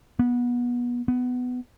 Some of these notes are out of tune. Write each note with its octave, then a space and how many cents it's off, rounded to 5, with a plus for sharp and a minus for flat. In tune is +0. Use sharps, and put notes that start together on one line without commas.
B3 -25
B3 +15